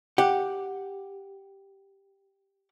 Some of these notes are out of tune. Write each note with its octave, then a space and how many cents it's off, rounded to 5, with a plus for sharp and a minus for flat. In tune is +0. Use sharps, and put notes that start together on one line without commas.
G4 +0 F#5 +0